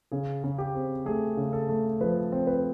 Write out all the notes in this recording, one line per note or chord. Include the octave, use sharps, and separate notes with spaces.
C#3 G#4
C#3
G4
C4
A3 G#4
C#3
A4
A3
F3 B4
C4
B4